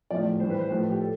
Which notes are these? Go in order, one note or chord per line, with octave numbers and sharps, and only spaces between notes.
A2 F3 D5
G2 E3 C5
B4
C5
A2 F3 B4
G4
A4